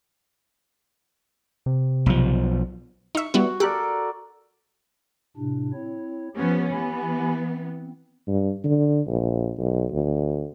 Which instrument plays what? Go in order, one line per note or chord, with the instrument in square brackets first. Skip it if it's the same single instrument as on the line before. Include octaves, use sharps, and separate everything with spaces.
[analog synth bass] C3
[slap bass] B1 F3
[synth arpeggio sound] D#4 E5 [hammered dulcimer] C#6
[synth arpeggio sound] G3 B3 E4 [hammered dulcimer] F#4
[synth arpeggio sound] G4 F#6 [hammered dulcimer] A4 A#4 D5
[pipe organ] A2 C3 D4
C4 E4 C#5
[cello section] F3 B3 C#4 [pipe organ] G4
[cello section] E3 B3 [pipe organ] G4 G#5 B5
[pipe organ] C4
[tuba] G2
D3
A#1
B1
D2